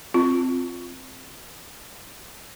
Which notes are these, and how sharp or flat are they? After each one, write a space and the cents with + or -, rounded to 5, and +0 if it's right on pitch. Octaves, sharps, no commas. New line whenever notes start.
C4 +0 F4 +0